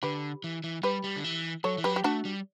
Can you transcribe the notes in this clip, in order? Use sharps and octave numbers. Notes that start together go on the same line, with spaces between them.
D3 G4 B4
E3
E3
G3 G4 B4
G3
D3
E3
F#3 A4 C#5
E3
F#3 G4 B4
G4
A3 D4 F#4
G3